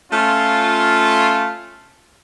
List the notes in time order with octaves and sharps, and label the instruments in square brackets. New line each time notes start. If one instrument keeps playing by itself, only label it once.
[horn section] A3 C#4 F4